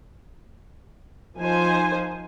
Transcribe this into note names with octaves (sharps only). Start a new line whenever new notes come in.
F3 D#4 C5 G#5